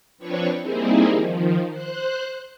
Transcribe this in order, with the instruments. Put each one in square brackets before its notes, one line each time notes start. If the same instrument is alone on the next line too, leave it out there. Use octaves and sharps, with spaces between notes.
[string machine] F3 C4 D4 B4 C#5 C#6
G3 A#3 C4 D#4 E4 G#4
D#3 F3
C5 F#6